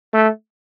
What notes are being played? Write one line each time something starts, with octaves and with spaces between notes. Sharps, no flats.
A3